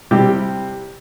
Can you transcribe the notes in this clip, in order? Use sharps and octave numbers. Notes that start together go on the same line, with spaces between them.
C3 G3 E4 G4